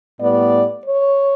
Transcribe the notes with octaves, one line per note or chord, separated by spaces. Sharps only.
A2 G3 B3 D5
C#5